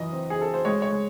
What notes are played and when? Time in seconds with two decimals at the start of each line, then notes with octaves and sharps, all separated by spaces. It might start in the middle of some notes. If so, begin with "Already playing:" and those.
Already playing: F#2 E3 D#5
0.12 C4
0.30 G#4
0.38 C4 A4
0.54 C5
0.65 G#3 C#5
0.82 C#5
0.91 G#3